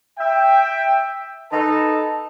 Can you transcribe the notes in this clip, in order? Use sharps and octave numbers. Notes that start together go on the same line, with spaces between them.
E5 G5
D#4 A4 B4 A5